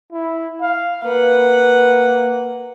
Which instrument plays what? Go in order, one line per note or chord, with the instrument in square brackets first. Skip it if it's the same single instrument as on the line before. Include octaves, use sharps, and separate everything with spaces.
[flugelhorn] E4
F5
[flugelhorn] A#3 [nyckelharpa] B4 F#5